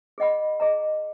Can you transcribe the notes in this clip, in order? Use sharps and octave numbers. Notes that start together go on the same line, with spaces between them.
G#4 D#5 F#5 B5
G#4 D#5 A#5